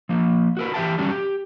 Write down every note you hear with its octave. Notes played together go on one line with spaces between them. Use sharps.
F3 A#3
F#4 A#4 B4
E3 G4 C5 E5 G5 A5
D3 F#3 G3 C#4 D4
G4